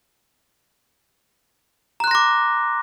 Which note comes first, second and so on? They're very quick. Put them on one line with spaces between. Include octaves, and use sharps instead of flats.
A#5 F#6 C6 A#6 D6